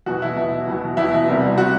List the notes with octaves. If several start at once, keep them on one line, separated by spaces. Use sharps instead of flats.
E2 B2 F#3 F#4
E4
E2 B2 F#3
E2 B2 F#3
E2 B2 F#3 E4
C2 C3 G3
C3 G3 F#4